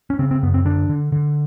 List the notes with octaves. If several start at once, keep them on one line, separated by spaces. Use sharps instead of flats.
C#4
C#3 C4
C4
F#2 B3
C4
D3 D4
D3
D3